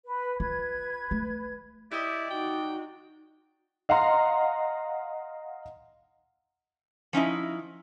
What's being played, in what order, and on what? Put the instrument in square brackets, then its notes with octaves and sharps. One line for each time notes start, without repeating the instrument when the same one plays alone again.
[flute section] B4
[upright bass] F4 [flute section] B4 G#6
[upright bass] A3
[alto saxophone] E4 [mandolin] G4 D#5 [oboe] D5
[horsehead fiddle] D#4 F#4 [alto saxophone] G5
[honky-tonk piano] D#5 F5 F#5 A#5 C6
[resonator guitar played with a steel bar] F3 C#4 D#4 E4